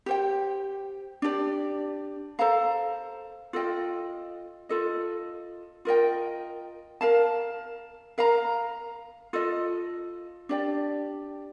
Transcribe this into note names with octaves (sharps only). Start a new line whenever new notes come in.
G4 C5 G5
D4 G4 D5
A4 C5 F5 A#5
F4 A4 D#5 G5
F4 A4 D#5
F4 A#4 D#5 G5
A#4 F5 A5
A#4 F5 A#5
F4 A4 D#5
D4 G4 D5 G5